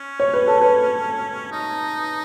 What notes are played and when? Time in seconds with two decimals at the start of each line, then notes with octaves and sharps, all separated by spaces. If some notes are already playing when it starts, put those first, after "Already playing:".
Already playing: C#4
0.20 C#5
0.34 B4
0.48 A4
0.62 B4
1.51 D#4